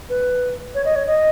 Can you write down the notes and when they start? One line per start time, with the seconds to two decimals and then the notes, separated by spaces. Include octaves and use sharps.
0.10 B4
0.75 C#5
0.85 D#5
0.96 C#5
1.07 D#5